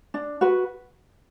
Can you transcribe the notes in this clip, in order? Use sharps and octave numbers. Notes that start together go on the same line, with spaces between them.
D4
F#4 B4